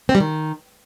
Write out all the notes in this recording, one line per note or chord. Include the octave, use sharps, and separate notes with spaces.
C4
G3
D#3